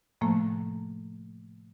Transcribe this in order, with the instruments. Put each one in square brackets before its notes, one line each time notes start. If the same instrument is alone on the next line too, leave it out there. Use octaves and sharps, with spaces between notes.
[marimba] A2 C3 F3 A3 A#3